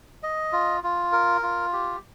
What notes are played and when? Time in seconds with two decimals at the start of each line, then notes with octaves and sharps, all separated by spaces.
0.23 D#5
0.53 F4
0.84 F4
1.12 A#4
1.43 F4
1.73 G4